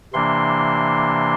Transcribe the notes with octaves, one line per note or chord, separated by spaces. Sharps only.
C3 E3 A#3 D4 C6